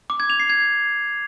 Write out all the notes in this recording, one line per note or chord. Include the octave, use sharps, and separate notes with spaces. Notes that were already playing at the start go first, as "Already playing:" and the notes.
D6
G#6
F7
C7
G#6